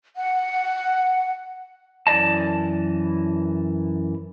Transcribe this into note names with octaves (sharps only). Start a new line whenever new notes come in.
F#5
F#2 E3 D5 D#5 A5